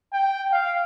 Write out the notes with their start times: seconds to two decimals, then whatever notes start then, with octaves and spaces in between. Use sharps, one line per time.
0.13 G5
0.52 F5